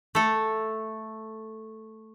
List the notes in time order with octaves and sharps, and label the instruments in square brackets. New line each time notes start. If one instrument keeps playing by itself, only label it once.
[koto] A3 A4